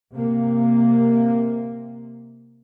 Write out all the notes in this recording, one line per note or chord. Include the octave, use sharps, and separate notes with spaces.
C3 A#3